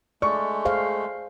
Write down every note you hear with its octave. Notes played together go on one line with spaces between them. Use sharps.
G#3 A3 D5 C#6
G#4 C5 F5